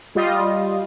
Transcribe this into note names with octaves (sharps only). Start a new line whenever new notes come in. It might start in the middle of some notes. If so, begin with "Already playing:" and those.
G3 F4 D#5